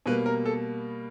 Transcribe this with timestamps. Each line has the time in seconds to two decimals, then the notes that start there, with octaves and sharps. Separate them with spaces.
0.06 B2 G3 A#3 B4
0.26 A#4
0.46 A4